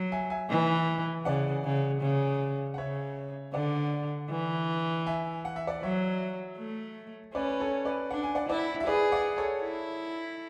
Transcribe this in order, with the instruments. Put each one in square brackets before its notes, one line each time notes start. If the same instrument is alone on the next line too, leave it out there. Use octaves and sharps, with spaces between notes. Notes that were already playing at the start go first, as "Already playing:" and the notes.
Already playing: [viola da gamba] F#3
[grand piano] E5 G#5
E5 G#5
[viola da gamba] E3
[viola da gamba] C#3 [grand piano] D5 F#5
[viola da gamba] C#3
C#3
[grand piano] F#5
[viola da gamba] C#3 [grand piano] C#5 E5
[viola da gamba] D3 [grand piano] D5 F#5
[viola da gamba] E3
[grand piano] E5 G#5
F#5
E5
D5 F#5
[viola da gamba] F#3 [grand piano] C#5 E5
[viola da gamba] A3
[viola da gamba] C#4 [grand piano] B4 D5
[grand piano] B4
A4 C#5
B4 D5
[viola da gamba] D4 [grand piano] F#5
[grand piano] G#5
D5 F#5
[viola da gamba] E4 [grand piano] D5 F#5
[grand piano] E5
[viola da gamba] G#4 [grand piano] B4 D5
[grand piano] D5 F#5
A4 C#5
[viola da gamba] E4